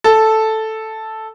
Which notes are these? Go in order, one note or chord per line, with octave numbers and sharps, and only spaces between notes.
A4